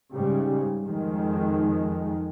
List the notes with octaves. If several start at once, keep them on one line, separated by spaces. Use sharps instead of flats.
G#2 C#3 G3
F2 D#3 G#3